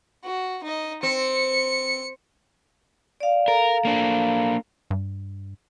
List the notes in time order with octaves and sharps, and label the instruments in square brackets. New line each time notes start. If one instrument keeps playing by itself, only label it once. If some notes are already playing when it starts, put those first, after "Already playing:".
[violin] F#4
D#4 D#5
[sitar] C4 [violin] C#7
[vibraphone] D5 F5
[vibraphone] A4 F5 A#5 [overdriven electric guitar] A#4
[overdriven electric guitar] A#3 D4
[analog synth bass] G2